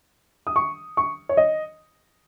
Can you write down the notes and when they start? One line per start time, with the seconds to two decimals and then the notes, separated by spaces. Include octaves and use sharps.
0.47 D#6
0.56 C#6
0.97 C#6
1.29 C#5
1.37 D#5